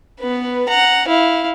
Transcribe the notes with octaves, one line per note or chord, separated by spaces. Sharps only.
B3 B4
F#5 A#5
E4 F5